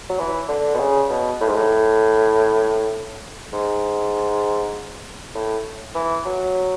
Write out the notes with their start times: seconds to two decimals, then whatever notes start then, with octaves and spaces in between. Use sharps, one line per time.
0.10 F#3
0.19 E3
0.49 D3
0.74 B2
0.80 C#3
1.10 B2
1.40 A2
1.48 G#2
1.55 A2
3.53 G#2
5.35 A2
5.95 E3
6.26 F#3